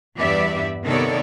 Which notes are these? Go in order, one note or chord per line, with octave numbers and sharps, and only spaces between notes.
E2 G2 B3 G4 D5 E5
C3 D#3 B3 A4 C#5 D5